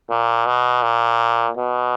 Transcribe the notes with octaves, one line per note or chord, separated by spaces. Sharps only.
A#2
B2
A#2
B2